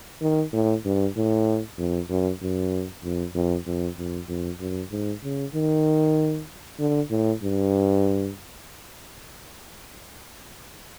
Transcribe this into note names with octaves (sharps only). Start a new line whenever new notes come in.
D#3
A2
G2
A2
F2
F#2
F#2
F2
F2
F2
F2
F2
F#2
G#2
C#3
D#3
D3
A2
G2